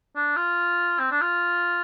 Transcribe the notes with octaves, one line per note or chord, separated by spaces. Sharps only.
D4
F4
C4
D4
F4